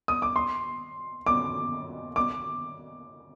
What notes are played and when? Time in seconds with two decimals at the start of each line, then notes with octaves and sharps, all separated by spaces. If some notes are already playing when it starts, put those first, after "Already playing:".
0.08 D#6
0.22 D6
0.36 C6
1.26 D6
2.16 D6